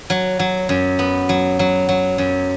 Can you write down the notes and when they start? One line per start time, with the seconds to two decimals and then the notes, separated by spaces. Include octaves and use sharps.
0.10 F#3
0.39 F#3
0.69 F#2
0.99 B3
1.29 F#3
1.59 F#3
1.89 F#3
2.18 F#2